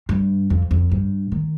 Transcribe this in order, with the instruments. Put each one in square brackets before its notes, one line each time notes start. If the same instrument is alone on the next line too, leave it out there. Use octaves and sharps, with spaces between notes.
[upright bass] G2
F2
F2
G2
D#3